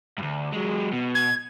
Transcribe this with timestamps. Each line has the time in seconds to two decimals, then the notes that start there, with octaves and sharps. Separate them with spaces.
0.18 D2 G2
0.53 F#3 G#3
0.93 B2
1.15 G#6